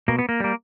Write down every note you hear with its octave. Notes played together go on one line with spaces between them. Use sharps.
B2 A#3
B3
A#3
G3 A#3